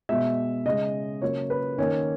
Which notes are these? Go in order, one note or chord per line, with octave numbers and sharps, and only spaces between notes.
B2 G#3 E5
C#3 G#3 D#5
C#3 F#3 A#3 C#5
B4
D#3 A#3 C#4